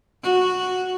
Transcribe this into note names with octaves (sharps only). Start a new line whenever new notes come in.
F#4